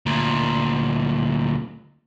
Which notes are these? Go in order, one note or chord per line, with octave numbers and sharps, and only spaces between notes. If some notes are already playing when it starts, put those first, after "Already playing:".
D2 A#2